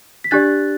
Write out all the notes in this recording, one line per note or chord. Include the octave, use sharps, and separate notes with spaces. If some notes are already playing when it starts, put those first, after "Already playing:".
B6
D4 G4 D5 F#6 A6